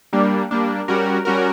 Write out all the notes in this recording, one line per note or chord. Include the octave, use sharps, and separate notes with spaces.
G3 A#3 D4
G3 A#3 D4
G3 C#4 F#4 A#4
G3 C#4 F#4 A#4